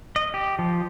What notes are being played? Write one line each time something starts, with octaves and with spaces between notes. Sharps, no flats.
D#5
G4
F3